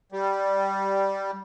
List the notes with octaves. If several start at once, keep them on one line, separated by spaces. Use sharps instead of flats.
G3